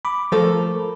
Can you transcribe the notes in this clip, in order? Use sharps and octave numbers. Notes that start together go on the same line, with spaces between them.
B5 D6
F3 A3 A4 A#4